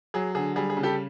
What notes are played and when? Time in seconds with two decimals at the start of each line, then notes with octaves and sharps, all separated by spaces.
0.14 F#3 G#4
0.35 D3 G#4
0.56 G3 G#4
0.70 G#4
0.77 C#3
0.83 G4 A4